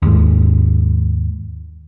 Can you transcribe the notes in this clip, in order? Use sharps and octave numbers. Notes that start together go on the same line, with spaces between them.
D#2 G#2